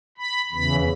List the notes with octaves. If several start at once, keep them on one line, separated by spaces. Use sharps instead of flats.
B5
E2 C#3 E3 B5